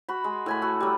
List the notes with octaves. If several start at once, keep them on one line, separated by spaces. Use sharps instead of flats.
F#4 B5
G#3
A2 G#5 B5
F#4 A4
F#3 G3